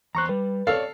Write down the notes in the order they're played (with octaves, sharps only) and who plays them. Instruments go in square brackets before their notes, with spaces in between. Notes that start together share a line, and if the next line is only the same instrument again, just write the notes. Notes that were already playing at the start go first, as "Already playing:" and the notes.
[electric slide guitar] E2 C5 [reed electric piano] A#5 C#6 F#6
[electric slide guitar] G3 [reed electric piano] B4
[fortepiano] A4 F5 [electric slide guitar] C#5 D5